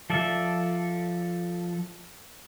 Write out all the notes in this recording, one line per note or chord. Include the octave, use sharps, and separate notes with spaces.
F3 A4 D5 E5